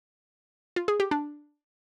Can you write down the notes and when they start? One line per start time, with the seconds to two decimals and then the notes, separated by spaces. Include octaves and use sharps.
0.76 F4
0.88 G#4
1.00 G4
1.11 D4